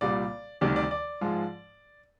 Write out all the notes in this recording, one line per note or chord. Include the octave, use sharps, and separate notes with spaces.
C2 A#2 G3 D5
D2 C3 D#3 G3 D5
D5
D5
G#2 F3 G#3